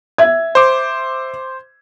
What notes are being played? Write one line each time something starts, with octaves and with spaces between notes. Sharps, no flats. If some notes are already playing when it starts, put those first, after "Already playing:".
E5 G#6
C5 D6